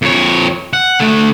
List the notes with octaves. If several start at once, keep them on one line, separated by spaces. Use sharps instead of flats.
F2 C#5
F#5
D3 A3